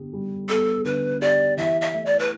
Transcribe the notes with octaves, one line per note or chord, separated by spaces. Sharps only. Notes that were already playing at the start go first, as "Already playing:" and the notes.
Already playing: D3 B3 G4
G3
B3 A4
D3 B4
G4 D5
E3 E5
E5
A3
D5
B4